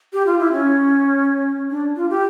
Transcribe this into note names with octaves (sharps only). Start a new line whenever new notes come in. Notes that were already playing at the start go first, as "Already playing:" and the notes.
G4
F4
E4
C#4
D4
F4
G4